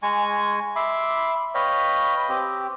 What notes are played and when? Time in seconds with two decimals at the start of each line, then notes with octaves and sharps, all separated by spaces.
0.03 G#3 G#5 C#6
0.76 E5 B5 C6 D6
1.55 B4 C#5 D#5 F5 G5 B5
2.29 C4 G4